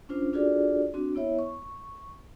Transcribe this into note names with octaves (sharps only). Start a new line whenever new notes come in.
C#4 D4 F4 C5
D4 F4 F#4 G#4 A4 D5
C4 D4 F#4
B3 E4 C#5 E5
C#6